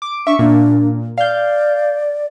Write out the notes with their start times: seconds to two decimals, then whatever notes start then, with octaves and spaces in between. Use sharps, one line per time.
0.02 D6
0.27 D4 E5 C#6
0.39 A#2 D4
1.18 D5 F5 G6